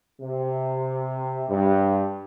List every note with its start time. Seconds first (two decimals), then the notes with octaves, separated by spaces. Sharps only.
0.20 C3
1.49 G2